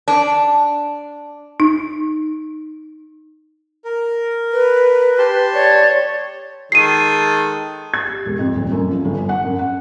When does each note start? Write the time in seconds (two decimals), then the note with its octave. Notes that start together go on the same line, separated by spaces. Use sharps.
0.08 D4
1.60 D#4
3.85 A#4
4.52 B4
5.18 G4 A5 C6
5.54 C#5 D5
6.72 D#3 G#3 A4 C7 D#7
7.94 G#6
8.06 G4
8.26 E1
8.38 F2
8.56 D#1
8.72 F#2
8.91 F3
9.05 G1
9.18 G#5
9.29 F#5
9.44 F#2
9.59 F#5